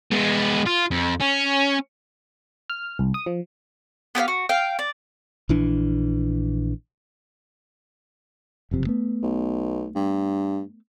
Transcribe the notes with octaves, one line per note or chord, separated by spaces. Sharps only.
G#3 B3
F4
F2
C#4
F6
C2
D#6
F3
B3 G4 C5 F5
F#4
F5 G5
D5
A#1 E3 D4
F#1 F2 C3
A3 B3
B1
G2